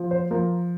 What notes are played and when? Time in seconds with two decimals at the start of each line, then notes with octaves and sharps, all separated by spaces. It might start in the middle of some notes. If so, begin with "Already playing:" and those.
Already playing: F3
0.11 C5
0.31 F3 A#4